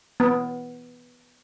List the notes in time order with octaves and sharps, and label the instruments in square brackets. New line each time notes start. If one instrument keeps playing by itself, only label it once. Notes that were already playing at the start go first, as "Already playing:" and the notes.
[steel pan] B3